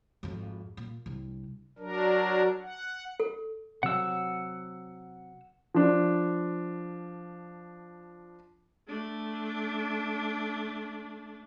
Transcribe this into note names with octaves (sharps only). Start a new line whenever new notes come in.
G#1 F2
A#2
C2 D4
F#3 D4 A#4
F#5
A4
C3 F#3 F#5 E6
F3 D4
A3 D4